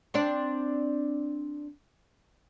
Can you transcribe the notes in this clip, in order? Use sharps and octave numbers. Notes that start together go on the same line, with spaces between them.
C4 D4 D5